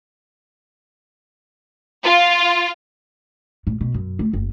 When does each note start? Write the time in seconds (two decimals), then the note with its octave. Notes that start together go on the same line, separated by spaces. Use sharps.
2.03 F4
3.67 A2
3.81 B2
3.94 F#2
4.19 A3
4.33 F#1